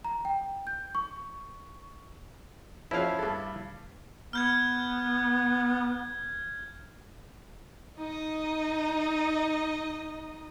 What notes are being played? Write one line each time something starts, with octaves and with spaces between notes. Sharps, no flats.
A#5
G5
G6
C#6
F3 C#4 E4 F#4 F5
G2 A4
B3 F6 G6 G#6
D#4 D#5